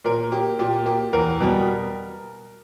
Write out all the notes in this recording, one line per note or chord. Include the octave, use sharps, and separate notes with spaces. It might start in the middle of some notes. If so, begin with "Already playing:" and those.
A#2 A#4
A#3 G4
A#2 G4
A#3 G4
E2 A#4
B2 G3 B3